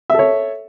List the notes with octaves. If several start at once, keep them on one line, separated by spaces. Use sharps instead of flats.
A4 C#5 E5